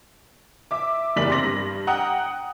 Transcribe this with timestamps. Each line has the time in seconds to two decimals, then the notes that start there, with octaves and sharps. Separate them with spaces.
0.71 E5 D6
1.16 F#1 E2 G3 D5 B6 F#7
1.29 C3 C6 D6 A#6 F#7
1.43 G2
1.87 F#5 G5 A#5 D#6 F#6